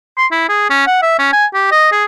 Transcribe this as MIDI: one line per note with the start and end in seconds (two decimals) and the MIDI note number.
0.17 0.26 84
0.31 0.46 64
0.49 0.68 68
0.70 0.85 61
0.87 1.01 78
1.02 1.16 76
1.19 1.29 61
1.32 1.46 80
1.54 1.69 67
1.71 1.88 75
1.92 2.04 68